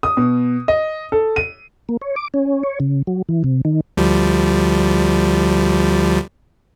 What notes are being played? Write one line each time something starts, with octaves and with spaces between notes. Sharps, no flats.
D#6
B2
D#5
A4
D#7
A#3
C#5
D6
C#4
C#5
C#3
F#3
E3
C3
D#3
D2 F3 G3